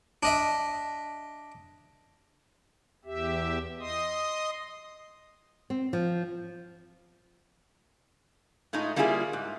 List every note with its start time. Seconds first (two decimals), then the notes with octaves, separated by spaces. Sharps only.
0.23 D4 D#5 E5
3.05 E2 G4 E5
3.80 D#5 C6 D#6
5.70 C4
5.93 F3
8.73 A2 G#3 A3 D#4 F4
8.96 G3 A#3 E4 F4 G4 G#4
9.33 G#2